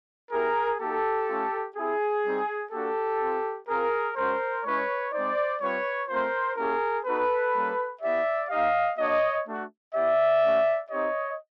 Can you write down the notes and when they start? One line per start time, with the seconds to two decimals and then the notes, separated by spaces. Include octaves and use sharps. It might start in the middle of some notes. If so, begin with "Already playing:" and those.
0.31 B3 E4 G4 G#4 A#4
0.79 A#3 D#4 F#4 G4 A4
1.28 A3 C#4 F4
1.75 C4 E4 G4 G#4
2.24 G3 C4 D#4
2.72 A#3 D4 F#4 G4 A4
3.20 C4 F4
3.68 C4 F4 G#4 A#4
4.16 G#3 C#4 F#4 A#4 C5
4.64 G#3 C#4 E4 B4 C#5
5.13 G#3 C4 D#4 C5 D5
5.61 G3 C4 F4 B4 C#5
6.09 A3 C4 F4 A#4 C5
6.57 A#3 C#4 E4 G4 G#4 A#4
7.05 B3 D#4 F#4 A4 B4
7.54 G3 A#3 C#4
8.02 B3 E4 G4 D5 E5
8.49 A#3 D#4 G4 D#5 F5
8.98 A#3 D4 F#4 C#5 D#5
9.46 A3 D4 F#4
9.94 B3 E4 G4 D5 E5
10.42 A3 C#4 F#4
10.90 C4 D#4 G4 C#5 D#5